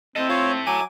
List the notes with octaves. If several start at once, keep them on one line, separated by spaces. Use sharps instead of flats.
C4 E4 A4 D#5
F4 C#5
F#3 G#5 D6